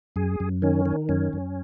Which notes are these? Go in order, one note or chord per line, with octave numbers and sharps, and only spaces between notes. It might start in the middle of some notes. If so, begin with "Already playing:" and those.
F#2 G#4
F#2
D#3 C#4
D#3
F#2 C#4
F#2